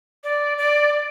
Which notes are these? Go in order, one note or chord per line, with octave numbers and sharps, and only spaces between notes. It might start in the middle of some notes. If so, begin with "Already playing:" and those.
D5
D5